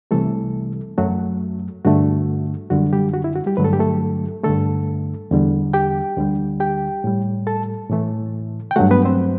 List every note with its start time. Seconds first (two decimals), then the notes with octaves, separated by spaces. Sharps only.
0.11 C2 C3 E3 G3 A3 A4
0.98 F#2 F#3 A3 F#4
1.85 G2 D3 A3 F#4
2.70 F#2 D3 G3 F#4
2.93 G3 G4
3.14 F#4
3.24 E4
3.36 F#4
3.47 G3 G4
3.57 G2 D3 F#3 A3 B4
3.64 A4
3.73 G4
3.79 A3 A4
4.44 G2 D3 A3 A4
5.31 E2 D3 G3
5.73 G4 G5
6.17 D2 D3 G3
6.60 G4 G5
7.04 A2 G3
7.47 A4 A5
7.90 A2 E3 A3
8.71 G5
8.76 G2 F#3 A3 F#4 F#5
8.91 B3 B4
9.05 C4 C5